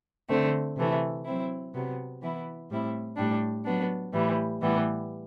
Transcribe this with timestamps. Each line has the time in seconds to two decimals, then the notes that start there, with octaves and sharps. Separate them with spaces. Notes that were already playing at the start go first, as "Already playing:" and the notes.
0.29 D3 A3 C4
0.76 C3 E3 A3
1.25 F#3 C4 E4
1.73 C3 F#3 B3
2.21 E3 B3 E4
2.69 A2 G3 C4 E4
3.17 A2 G3 D4
3.65 F#3 B3 D4
4.12 A2 E3 G3
4.61 A2 E3 G3 B3